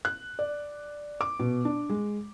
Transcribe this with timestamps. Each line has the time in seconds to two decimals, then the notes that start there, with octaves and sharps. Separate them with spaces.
0.05 F#6
0.39 D5
1.21 D6
1.40 B2
1.65 D4
1.90 G#3